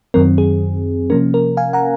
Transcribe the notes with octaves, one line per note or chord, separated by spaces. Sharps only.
F#2 D#3 F#3 C4 A#4
G#4
C3 F3 A#3 C#4 A#4
A#4
F5 G#5
F#5 A#5